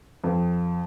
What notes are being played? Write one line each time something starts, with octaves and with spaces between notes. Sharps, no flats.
F2